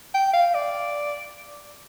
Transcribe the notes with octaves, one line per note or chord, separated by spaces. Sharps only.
G5
F5
D5